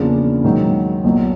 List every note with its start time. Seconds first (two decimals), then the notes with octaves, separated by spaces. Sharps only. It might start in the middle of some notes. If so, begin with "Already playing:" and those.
Already playing: E2 C#3 F3 A#3 D4
0.44 G#2 D#3 F#3
1.05 B1 A#2 F#3